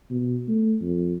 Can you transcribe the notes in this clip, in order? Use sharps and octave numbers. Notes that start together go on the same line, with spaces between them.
B2
A3
F2